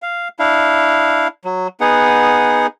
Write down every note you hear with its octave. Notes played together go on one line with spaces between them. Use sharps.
F5
D4 E4 F5
F#3
B3 D#4 G#4 F#5